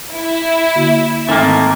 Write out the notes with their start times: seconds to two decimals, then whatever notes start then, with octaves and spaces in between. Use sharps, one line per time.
0.12 E4
0.76 D3 A#3 F#4
1.29 G#1 A3 A#3 D#4 E5 G#5